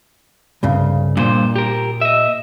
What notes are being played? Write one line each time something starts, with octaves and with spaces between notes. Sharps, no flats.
C2 G2 C#3
G2 A#2 C5
G4 A#4
D#5 E5